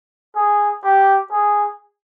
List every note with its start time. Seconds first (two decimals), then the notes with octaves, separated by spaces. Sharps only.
0.36 G#4
0.84 G4
1.31 G#4